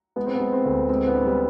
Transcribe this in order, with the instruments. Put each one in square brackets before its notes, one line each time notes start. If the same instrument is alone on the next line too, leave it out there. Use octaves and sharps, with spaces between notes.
[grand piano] G#3 [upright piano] B3
[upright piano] C4
B3
[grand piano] G#3
[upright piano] C4
[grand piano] D2
[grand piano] G#3 [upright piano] C4
[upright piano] B3
[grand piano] D4
[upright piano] G3